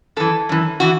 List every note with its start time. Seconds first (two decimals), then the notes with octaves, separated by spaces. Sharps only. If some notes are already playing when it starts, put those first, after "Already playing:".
0.17 F#2 E3 A4
0.49 F#2 E3
0.80 E3 F#4